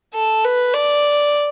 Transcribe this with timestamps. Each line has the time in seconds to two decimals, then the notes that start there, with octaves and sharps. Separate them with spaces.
0.14 A4
0.45 B4
0.75 D5